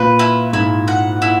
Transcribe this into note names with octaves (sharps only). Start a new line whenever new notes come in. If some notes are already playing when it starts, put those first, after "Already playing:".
Already playing: A#2 B4
E4
G#2 E4
F#5
E4